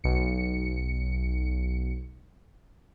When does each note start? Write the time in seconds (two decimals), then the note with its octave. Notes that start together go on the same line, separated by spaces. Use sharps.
0.04 B1 C#7